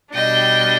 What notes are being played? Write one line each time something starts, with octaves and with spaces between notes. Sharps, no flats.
B2 G3 D4 D#5 G5